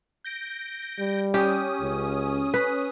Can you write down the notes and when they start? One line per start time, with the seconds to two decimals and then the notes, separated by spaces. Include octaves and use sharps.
0.24 G6 A#6 D7
0.99 G3
1.34 C#4 G4 D#6
1.81 C#2
2.54 B4